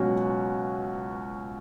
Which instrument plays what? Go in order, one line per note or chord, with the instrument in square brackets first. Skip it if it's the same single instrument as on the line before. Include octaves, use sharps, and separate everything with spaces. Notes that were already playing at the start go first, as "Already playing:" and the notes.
Already playing: [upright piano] C#2 B2 F#3 C#4 F#4